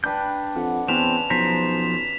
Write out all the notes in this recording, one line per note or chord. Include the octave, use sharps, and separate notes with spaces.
D4 B4 G5 B5 G6
F2 F#5
E2 C4 C#4 B4 A5 E7 F7
B1 F3 C5 A#5 B6